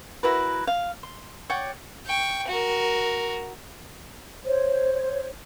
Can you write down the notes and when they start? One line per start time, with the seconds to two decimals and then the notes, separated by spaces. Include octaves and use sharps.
0.23 E4 F#4 A#4 B4
0.67 F5
1.03 C6
1.50 C#5 D5 F#5 G5
2.06 G5 C#6
2.48 F#4 A#4
4.45 C5 C#5